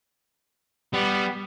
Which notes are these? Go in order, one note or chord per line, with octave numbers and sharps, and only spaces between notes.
G3 B3